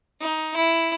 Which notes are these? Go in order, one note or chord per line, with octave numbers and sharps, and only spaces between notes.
D#4
E4